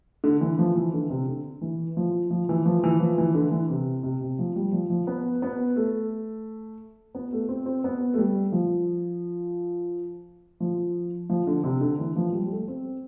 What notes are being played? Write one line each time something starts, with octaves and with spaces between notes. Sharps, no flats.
D3
E3
F3
E3
D3
C3
D3
E3
F3
F3
E3
F3
E3
F3
E3
D3
E3
C3
C3
C3
F3
G3
F3
F3
B3
B3
A3
B3
A3
C4
C4
B3
A3
G3
F3
F3
F3
D3
C3
D3
E3
F3
G3
G3
A3
C4